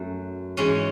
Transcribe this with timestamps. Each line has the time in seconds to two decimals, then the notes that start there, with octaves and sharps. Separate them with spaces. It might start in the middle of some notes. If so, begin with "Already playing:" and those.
Already playing: F#2 A3
0.57 G#2 E3 G#3 C#4